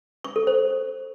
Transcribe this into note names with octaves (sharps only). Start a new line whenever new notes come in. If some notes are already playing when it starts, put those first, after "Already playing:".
C#6
A4
C5